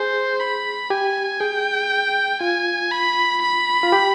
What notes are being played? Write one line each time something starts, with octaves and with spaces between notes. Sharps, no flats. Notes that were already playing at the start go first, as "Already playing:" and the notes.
Already playing: G#4 C5
B5
G4 G#5
G#4 G5
F4 G#5
B5
B5
F4
G4